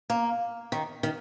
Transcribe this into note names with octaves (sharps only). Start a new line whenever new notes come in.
A#3
D#3
D#3